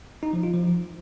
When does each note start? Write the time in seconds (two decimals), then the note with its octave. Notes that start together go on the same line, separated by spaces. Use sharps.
0.23 D#4
0.33 F3
0.43 F4
0.54 F3